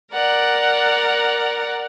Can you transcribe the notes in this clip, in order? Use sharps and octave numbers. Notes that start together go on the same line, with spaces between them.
A#4 D5 F#5